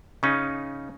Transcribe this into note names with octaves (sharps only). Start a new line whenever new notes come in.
C#3 C#4 D#4